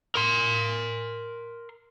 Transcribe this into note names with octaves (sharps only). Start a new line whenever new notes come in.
A#4 C6